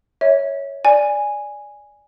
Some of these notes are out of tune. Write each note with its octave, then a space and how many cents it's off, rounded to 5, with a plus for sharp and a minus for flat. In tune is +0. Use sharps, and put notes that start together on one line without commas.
C#5 +0 E5 -25
D5 +0 G#5 -5